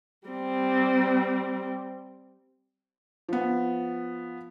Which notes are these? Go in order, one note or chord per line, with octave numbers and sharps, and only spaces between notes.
G3 C4
F3 B3